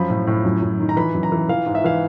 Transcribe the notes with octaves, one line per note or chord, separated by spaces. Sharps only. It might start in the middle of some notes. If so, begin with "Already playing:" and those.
Already playing: F#2 F3 B5
A2
A2
F#2
F#2
D#3
A#5
E3 B5
F#2
A#5
E3
E3 F5
G#2
E5
E3 F5